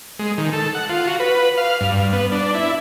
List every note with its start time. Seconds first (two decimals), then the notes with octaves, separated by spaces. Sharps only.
0.19 G#3
0.38 D#3
0.53 A4
0.75 F#5
0.90 F4
1.07 F#4
1.20 B4
1.58 F5
1.81 G2
2.13 B3
2.32 D4
2.55 E4